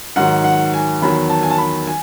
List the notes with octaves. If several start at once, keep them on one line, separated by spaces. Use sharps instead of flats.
G#2 D#3 F#3 F#5
F#5
G#5
E2 D#3 F#3 B5
A5
G#5
A5
B5
G#5